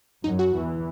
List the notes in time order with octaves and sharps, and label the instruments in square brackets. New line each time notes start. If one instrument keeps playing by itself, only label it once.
[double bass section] F#2 F#3 [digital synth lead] D#4
[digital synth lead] F#4
[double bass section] E2 E3